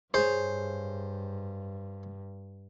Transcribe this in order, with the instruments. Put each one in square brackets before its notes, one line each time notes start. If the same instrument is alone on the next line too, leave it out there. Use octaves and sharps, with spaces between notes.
[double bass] G2 [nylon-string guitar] G#4 C#5 [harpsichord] C5